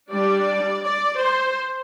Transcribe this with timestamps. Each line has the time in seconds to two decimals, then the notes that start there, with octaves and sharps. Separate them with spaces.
0.12 G3 D4 D5
0.84 D5
1.19 C5